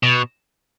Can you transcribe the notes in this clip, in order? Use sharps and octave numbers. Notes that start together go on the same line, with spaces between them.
B2